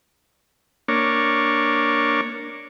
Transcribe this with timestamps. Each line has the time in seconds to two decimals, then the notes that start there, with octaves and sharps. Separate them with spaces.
0.88 A#3 D4 C#5